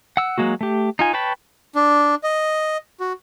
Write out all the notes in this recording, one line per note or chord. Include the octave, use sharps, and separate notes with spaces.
F#5 E6
F#3 G#3 A#3 F#4
A3 G4
D#4 F4 G#5
B4 C#5 G5 A5 B5
D4
D#5
F#4